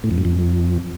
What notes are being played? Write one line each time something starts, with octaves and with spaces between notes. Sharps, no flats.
A2
F2
F#2
F2